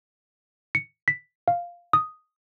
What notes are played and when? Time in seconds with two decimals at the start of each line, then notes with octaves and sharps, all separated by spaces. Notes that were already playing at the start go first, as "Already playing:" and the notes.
0.75 C#7
1.08 B6
1.48 F5
1.93 D#6